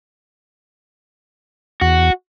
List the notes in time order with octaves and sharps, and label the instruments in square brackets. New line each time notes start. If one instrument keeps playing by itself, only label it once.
[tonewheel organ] E2 [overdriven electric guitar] F#4